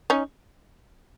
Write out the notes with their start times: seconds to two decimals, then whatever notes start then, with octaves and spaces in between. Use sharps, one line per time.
0.10 C#4 D#4